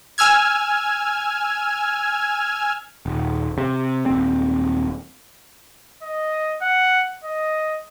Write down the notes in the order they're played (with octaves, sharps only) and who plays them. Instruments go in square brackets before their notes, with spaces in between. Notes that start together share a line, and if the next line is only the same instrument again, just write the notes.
[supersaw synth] G#5 E6 F6 G#6
[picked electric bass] D#1
C3
D#1 C4
[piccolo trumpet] D#5
F#5
D#5